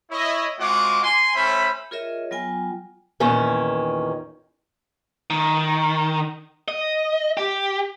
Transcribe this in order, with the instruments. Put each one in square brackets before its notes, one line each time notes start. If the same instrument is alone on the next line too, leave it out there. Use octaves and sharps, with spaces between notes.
[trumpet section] E4 C#5 D#5
G#3 C4 F4 F#4 F#5 D6
G#5 C6
A3 C#4 C5 E5 B5
[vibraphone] F4 G#4 A#4 C#5 D#5 E5
F#3 B3 F4 G5 G#5
[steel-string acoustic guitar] E2 A#2 D#3 C#4
[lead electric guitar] D#3
D#5
G4